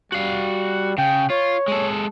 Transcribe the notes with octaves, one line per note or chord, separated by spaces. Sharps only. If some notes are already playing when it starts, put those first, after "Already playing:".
G3 F#4 F5
C#3 G5
F4 C#5
G#3 A4